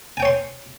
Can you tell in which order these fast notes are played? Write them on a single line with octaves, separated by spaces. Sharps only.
G#5 G5 C#5 C6